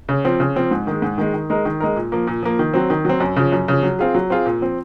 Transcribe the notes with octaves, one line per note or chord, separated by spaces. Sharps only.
C#3
F3 C4
C#3
F3 C4
G#2
D#3 G#3
G#2
D#3 G#3
D#3
G#3 D#4 A#4
D#3
G#3 D#4 A#4
A#2
F3 A#3
A#2
F3 A#3
D#3
F#3 C4
D#3
F#3 C4
F#2
C#3 F3
F#2
C#3 F3
F#3
C4 F4 G#4
F#3
C4 F4 G#4
A#2
F3 C4